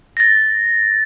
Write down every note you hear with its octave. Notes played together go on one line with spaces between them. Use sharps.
A6 A#6